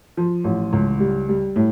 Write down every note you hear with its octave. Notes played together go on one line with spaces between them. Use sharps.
F3
A1
C#2
G3
G3
A2